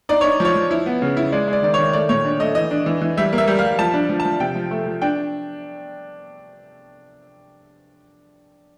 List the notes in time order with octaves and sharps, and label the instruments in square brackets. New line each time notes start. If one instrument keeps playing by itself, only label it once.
[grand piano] D#4 D5
D#4 C#5
F3 C#5
F3
E4
B3
C#3
E4
G#3 D5
G#3 D5
D#3 D5
C#5
D#3
A3 D5
A#2 C#5
D4
A3 D#5
E3 D#5
D4
E3
E3
G3 E5
A#3
E5
G3
F5
G3
F3 A5
D4
F3
A5
F3
C3 G5
F3
A3
F3
D4 G5